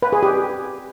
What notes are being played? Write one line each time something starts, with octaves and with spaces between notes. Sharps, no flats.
B4
G#4
G4